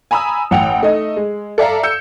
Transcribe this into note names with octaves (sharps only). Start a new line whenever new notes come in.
G#5 A#5 B5 D#6 E6
A1 F#5 G5 F7
A3 D#4 D#5
G#3
A4 D5 E5 F5 A#5
E6 G6 C#7